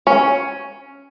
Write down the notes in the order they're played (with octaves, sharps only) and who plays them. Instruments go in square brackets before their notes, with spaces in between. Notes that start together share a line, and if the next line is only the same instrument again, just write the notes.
[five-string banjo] C#4